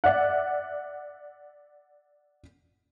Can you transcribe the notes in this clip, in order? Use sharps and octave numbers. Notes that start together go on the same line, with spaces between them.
D5 E5 F#5